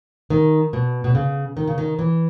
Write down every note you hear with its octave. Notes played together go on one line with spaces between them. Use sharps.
D#3
B2
B2
C#3
D#3
C#3
D#3
E3